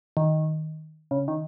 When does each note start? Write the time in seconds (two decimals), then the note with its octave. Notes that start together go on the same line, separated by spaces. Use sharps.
0.17 D#3
1.11 C#3
1.28 D#3